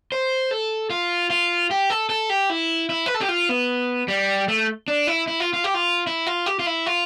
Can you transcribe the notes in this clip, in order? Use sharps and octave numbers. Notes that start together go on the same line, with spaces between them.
C5
A4
F4
F4
G4
A4
A4
G4
E4
E4
B4
A4
G4
F4
B3
G3
A3
D4
E4
E4
F4
F4
G4
F4
E4
F4
G4
F4
E4
F4